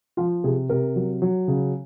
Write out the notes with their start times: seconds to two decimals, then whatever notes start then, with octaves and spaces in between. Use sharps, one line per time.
0.17 F3 F4
0.44 C3 G#4
0.69 C3 A#4
0.96 F#3
1.22 F#3
1.48 C#3